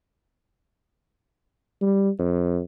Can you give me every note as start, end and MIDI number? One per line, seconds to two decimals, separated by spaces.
1.81 2.09 55
2.19 2.60 41